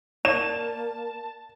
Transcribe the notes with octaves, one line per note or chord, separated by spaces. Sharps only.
A#3 D5 A5 E7